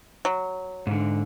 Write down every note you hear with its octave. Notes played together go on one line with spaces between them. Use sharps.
F#3
G#2 D3